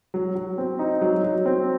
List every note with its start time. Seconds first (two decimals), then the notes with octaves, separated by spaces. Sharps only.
0.14 F#3
0.35 F#3
0.58 C4
0.79 D#4
1.01 F#3
1.24 F#3
1.46 C4